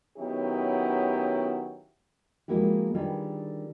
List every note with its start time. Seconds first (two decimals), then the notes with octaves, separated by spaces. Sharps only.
0.18 D#3 F#3 B3 C#4 E4 G4
2.48 F3 G#3 A#3 E4 F#4 G4
2.94 D3 D#3 G3 F4 G#4 B4